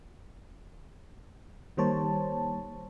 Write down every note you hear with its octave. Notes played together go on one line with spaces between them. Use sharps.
D#3 G3 A#3 C5 C#5 A5